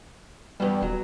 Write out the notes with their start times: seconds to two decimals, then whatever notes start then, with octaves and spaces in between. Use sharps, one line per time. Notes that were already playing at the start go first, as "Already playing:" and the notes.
0.60 E2 G2 G3
0.82 D#1 F#3